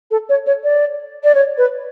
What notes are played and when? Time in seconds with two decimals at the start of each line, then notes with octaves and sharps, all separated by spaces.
0.11 A4
0.29 C#5
0.46 C#5
0.64 D5
1.24 D5
1.35 C#5
1.58 B4